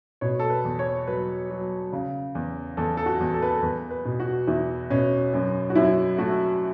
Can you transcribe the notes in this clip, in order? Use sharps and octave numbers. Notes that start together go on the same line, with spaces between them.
B2 C#5
A4
B4
E2
C#5
F#3 B4
F#3
C#3
E2
E2 A4
A4
F#4
E2
A4
B4
A4
E2 B4
B4
B2
F#4
E2 E4
B2 C#4
F#2 C#4
F#4
F#2 E4
A3 F#4